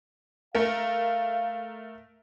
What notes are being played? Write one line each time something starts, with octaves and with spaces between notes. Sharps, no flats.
A3 A#4 F5